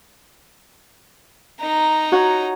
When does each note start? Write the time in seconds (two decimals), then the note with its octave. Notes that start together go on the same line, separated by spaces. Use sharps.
1.61 D#4 A#5
2.12 F#4 C#5 F#5